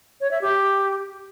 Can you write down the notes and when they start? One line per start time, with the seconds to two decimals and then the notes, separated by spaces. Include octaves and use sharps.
0.21 C#5
0.31 E5
0.41 G4